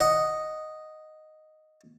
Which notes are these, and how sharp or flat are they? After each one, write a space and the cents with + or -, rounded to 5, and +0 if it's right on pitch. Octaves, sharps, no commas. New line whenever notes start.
D#5 +0 F#5 +0